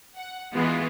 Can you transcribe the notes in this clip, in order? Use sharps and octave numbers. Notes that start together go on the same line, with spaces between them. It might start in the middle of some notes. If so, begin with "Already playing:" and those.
F#5
E3 G#3 B3 F4 F#4